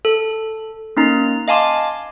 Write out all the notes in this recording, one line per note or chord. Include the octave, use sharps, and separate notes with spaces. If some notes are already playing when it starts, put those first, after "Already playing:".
A4
A#3 C#4 D#4 A#5
D#5 F5 G#5 A5 C6 D6